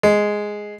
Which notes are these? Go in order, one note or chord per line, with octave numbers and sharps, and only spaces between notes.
G#3